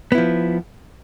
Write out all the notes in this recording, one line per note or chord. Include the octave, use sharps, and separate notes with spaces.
F3 B3 E4